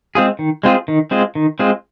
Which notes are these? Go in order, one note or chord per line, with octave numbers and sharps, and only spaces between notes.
G#3 C4 F4 G#4
D#3
G#3 C4 F4 G#4
D#3
G#3 C4 F4 G#4
D#3
G#3 C4 F4 G#4